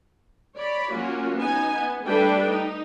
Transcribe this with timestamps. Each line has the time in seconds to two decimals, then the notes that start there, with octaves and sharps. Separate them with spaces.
0.56 C#5 D5 B5
0.92 F#3 A#3 C#4 F4 F#4
1.37 B3 D#4 G#5
1.74 B3
2.06 G3 A3 D4 A4 B4 G5
2.47 D#4